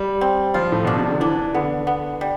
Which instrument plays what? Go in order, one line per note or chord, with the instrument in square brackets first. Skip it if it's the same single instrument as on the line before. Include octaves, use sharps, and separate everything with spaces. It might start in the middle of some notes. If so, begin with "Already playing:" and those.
Already playing: [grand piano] G3
[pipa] C4
[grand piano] F3 [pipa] F4
[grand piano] A2
[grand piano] B2 [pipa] D4
[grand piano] C3
D3
[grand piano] E3 [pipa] D4
[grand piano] D3 [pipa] B3
[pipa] B3
G3